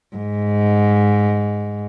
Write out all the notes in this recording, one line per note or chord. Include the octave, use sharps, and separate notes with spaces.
G#2